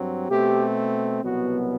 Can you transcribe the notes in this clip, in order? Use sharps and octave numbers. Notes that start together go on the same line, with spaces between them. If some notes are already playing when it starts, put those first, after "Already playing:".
Already playing: G2 F#3 C4
B2 A3 C4 G4
C2 B2 F#3 B3 F#4